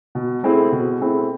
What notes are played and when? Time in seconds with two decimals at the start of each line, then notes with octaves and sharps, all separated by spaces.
0.15 B2
0.43 A3 C4 E4 G#4
0.72 B2
1.01 A3 C4 E4 G#4